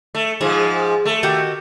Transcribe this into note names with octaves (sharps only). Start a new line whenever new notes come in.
A3
G#2 F3 G#4
A3
D#3 F#4 G4